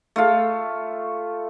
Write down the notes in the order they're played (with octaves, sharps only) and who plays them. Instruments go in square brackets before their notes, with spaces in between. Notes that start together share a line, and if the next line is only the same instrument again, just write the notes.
[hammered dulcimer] A3 F4 F5